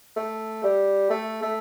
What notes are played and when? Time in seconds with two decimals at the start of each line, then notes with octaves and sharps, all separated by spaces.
0.16 A3
0.64 G3
1.10 A3
1.42 A3